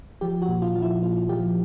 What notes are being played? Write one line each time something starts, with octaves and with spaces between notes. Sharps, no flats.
F3 G4
F#4
A#2
F4
F3
E4
A#2 F4
F3 G4